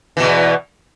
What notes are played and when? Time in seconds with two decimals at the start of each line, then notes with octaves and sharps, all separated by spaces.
0.17 E3
0.20 B2
0.24 E2